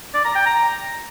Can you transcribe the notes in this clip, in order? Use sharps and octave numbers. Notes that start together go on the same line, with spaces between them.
D5
A#5
G5
A#5